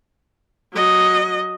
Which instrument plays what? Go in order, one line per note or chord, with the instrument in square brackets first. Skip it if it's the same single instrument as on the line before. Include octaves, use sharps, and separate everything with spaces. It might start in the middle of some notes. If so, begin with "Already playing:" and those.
[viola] F#3 D#5